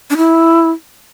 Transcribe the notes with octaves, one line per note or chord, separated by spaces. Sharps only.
D4
E4